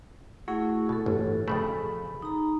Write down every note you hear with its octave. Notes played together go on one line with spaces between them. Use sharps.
A3 E4 F#4 G#4
B2 F#4 A4
G1 A2 E3
F2 C#3 A3 G#4 B5
D#4 A#5